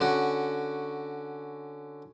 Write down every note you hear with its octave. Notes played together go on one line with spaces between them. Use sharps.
D3 C#4 F#4